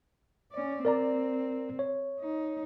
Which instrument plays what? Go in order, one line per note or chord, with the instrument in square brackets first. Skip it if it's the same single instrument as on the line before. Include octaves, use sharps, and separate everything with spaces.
[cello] C#4 D5
[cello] C4 [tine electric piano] A#4 D5 A#5
[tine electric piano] C#5
[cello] D#4